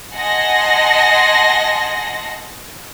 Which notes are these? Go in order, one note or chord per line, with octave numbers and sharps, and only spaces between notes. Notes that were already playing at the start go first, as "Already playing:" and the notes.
D#5 F#5 G#5 A5 C6 A#6